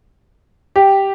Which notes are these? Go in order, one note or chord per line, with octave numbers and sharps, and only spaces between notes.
G4